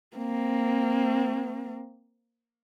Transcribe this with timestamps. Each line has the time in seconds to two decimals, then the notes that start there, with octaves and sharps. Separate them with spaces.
0.17 A#3 C4